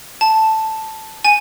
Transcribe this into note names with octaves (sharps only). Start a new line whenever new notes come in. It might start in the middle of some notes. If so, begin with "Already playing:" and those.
A5
G#5